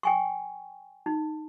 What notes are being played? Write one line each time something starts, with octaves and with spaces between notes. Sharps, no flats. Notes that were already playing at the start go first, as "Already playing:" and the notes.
G5 G#5 C#6
D#4